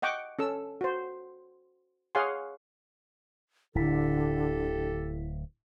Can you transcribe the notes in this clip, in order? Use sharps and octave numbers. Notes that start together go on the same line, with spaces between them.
D#5 F#5 G5 C#6 D6
C#4 A4 E6
F#4 C5
G#4 C#5 F5 F#5 G#5 C6
D1 D3 E4 G4 A4 B6